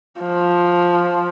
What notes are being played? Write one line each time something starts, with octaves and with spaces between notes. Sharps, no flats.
F3